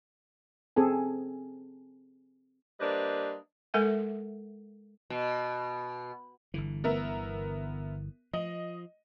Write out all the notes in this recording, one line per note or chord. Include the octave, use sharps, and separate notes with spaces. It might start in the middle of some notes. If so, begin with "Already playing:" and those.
C4 G#4 A4 G#5
G3 A#3 D4 B4 C5 D#5
G#3 A4 A#4 E5 F#5 G#5
B2
G1 D3 E3
B3 A#4 E5
F3 D#5